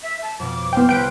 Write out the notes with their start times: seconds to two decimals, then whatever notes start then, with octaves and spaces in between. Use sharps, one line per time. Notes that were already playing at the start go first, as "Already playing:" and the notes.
0.03 E5
0.22 A5
0.39 F2 B2 D6
0.73 B3 E4 C5 G5 F6
0.89 C2 C3 B4 G5 D7